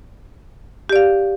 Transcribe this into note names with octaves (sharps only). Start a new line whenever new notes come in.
G4 D5 F5